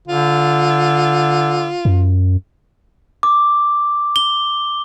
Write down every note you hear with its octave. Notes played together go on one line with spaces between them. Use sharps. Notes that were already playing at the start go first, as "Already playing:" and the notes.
D3 F4
F#2
D6
G7